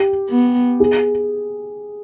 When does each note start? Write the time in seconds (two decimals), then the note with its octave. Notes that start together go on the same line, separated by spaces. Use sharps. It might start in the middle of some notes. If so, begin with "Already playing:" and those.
Already playing: G4
0.30 B3
0.80 G#4